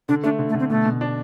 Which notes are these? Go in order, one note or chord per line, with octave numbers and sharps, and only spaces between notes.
D3 D4
A3 D4
D3
A3
D3
C4
B2 A3
B2
D4